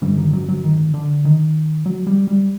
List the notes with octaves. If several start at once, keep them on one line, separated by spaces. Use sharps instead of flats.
A1 G2 D3 G3
D#3
F#3
F#3
D#3
D3
D#3
F#3
G3
G3